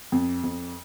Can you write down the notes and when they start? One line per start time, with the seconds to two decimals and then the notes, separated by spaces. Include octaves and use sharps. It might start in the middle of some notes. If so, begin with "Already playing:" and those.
0.12 F2
0.44 F2